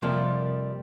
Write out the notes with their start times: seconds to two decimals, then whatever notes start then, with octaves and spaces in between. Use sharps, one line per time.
0.02 F2 C3 F3 G3 A#3 F5